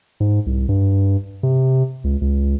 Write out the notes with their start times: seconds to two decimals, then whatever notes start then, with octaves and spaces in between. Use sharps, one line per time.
0.20 G#2
0.46 C2
0.69 G2
1.43 C3
2.04 C#2
2.21 C#2